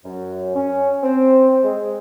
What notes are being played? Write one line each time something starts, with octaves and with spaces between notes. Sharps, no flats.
F#2
C#4
C4
G#3